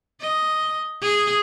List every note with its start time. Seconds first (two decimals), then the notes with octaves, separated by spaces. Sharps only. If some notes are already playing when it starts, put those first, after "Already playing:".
0.21 D#5
1.01 G#4